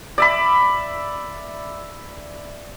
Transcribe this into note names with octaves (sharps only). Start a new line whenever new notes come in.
D5 E5 B5